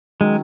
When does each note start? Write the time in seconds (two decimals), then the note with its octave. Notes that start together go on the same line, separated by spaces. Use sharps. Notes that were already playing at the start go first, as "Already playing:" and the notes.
0.20 D#3 F#3 G#3 C#4